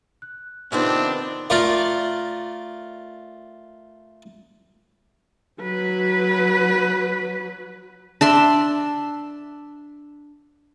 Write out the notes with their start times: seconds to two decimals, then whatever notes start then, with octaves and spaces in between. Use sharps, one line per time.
0.22 F#6
0.72 C3 D#3 B3 C4 D4 D#4 F4 B4
1.50 A3 F4 A#4 D5
5.61 F#3 B4
8.21 D4 E5 C6